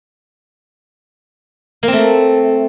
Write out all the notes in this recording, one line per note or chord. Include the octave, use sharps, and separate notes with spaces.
A#3
C4
A3